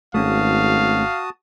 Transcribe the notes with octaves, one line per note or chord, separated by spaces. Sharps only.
G#1 A3 C#4 F#4 G#4 F5 A5 D#6